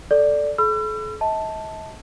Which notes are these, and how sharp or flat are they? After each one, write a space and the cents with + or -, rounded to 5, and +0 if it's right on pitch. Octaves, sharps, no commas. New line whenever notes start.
A4 +0 D5 +0
A4 -40 B5 +20 E6 +45
D#5 +45 A5 +0